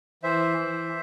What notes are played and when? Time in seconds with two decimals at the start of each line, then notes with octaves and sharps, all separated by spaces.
0.23 E3 C5 E5
0.58 E3